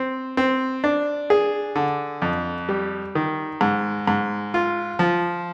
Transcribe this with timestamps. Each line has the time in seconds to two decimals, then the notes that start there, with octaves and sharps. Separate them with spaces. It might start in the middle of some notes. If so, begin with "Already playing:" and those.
Already playing: C4
0.37 C4
0.84 D4
1.30 G#4
1.76 D3
2.22 F2
2.69 G3
3.15 D#3
3.61 G#2
4.07 G#2
4.54 F4
4.99 F3